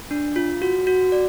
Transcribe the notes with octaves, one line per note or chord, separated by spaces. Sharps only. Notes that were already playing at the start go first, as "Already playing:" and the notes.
D4
F4
F#4
F#4
D5